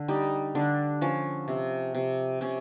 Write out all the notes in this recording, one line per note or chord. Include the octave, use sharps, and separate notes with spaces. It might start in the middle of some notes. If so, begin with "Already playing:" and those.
Already playing: D3
G3 D#4
D3 D4
F3 C#4
C3
C3
C3 C#4